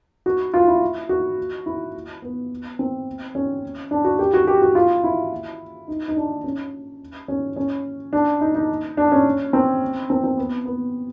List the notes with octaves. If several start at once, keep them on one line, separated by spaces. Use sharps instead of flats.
F#4
F4
E4
F#4
E4
B3
C4
C#4
D4
F#4
G4
F#4
G4
F#4
F4
E4
D#4
D#4
D4
C#4
C#4
C#4
D4
D#4
D#4
D4
C#4
C4
C4
C4
B3
B3